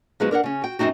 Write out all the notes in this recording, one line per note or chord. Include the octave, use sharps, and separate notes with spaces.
F3 F#3 G#3 B3 D#4 F#4
D4 A#4 C#5 F#5
C#3 C#4
F#4 G5
F#2 D#3 C4 D#4 F#4